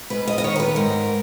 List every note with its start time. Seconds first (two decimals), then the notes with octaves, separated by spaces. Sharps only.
0.10 G#2 B4
0.27 D#5
0.38 D#5
0.44 D#3 C#5
0.56 A#4
0.60 B4
0.76 G#2 A#4